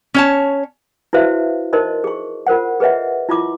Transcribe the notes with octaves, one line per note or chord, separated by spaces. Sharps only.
C#4 C#5 A5
E4 F#4 B4 C5 E5 F5
D#4 A#4 C5 D#5 C6
G#4 C#6
F4 A#4 C5 F#5
G#4 B4 C#5 D#5 E5 F#5
E4 F4 C6 D6